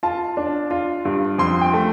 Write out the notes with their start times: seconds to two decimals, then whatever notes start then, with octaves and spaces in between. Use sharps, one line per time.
0.03 F4 A5
0.37 D4
0.71 F4
1.05 G2
1.38 F2 C6
1.61 G5
1.73 A3